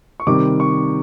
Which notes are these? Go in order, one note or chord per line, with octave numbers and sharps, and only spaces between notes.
C#6
C3 D#3 G3 D6
C#6